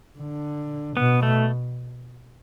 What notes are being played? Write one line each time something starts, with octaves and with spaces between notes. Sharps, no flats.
D3
B2 B3
A3